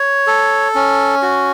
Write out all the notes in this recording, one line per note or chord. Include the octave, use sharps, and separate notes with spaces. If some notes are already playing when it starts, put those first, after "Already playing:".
Already playing: C#5
A4
C#4
F#4